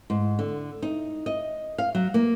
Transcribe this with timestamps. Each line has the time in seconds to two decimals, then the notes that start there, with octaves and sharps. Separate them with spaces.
0.10 G#2
0.39 D3
0.83 D#4
1.26 D#5
1.78 F5
1.95 F#3
2.14 A#3